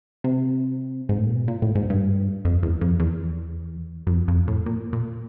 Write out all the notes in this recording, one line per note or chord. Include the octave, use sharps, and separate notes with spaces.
C3
G#2
A2
A#2
B2
A#2
A2
G#2
G2
F2
E2
F2
E2
F#2
F2
F2
A2
A#2
A#2